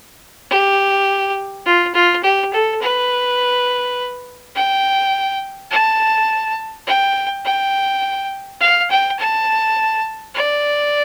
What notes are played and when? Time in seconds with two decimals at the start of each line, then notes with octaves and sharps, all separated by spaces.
0.50 G4
1.66 F4
1.94 F4
2.23 G4
2.53 A4
2.81 B4
4.55 G5
5.71 A5
6.87 G5
7.45 G5
8.61 F5
8.90 G5
9.19 A5
10.34 D5